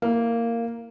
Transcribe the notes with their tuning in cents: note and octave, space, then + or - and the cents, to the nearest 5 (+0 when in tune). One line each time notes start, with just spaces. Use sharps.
A#3 -10 E4 +0